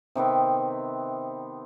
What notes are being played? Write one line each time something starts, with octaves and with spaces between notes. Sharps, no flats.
C3 D#3 B3 C4